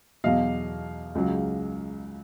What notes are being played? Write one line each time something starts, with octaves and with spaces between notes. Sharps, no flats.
E2 B2 F#3 D#5 F5
C#2 C#3 F#3